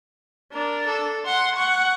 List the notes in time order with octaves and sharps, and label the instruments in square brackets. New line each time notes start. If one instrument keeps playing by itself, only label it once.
[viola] D4 [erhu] A#4
[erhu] A4
[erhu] F#5 [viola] C6
[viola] F#5 [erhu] C#6